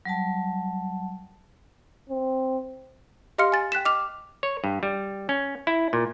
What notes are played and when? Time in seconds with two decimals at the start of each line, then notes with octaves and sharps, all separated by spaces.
0.05 F#3 G3 A5
2.09 C4
3.38 G4 D#5 F5 C6 F6 C#7
3.52 G#5 A6
3.72 G5 F#6 B6 E7
3.85 D#5 D6 F6 F7
4.43 C#5
4.64 G2
4.83 G3
5.29 C#4
5.67 E4
5.93 A#2